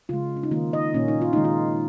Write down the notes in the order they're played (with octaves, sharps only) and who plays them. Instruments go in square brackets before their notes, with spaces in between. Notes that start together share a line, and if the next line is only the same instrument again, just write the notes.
[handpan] C#3 G#3 F4
C#4
D#4
D#3 A#3 F4
D#5
A#2 A#3 C#4
D#4
F4
D#3 G#3 D#4
F4